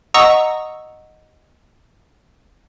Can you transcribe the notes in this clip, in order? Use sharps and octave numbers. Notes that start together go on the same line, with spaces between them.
D#5 F#5 A#5 C#6 D#6 E6